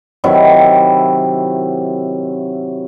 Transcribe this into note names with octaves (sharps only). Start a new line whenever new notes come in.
C3 D#3 F#3 E4